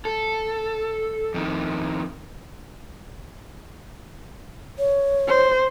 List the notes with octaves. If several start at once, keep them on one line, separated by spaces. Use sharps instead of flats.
A4
F2 D#3
C#5
C5